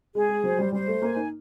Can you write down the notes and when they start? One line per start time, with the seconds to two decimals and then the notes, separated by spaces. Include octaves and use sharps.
0.15 G#3 G#4
0.29 G#3
0.44 F#3 C5
0.58 G3
0.73 G3 C5
0.87 A3
1.02 A#3 G#5
1.16 D#4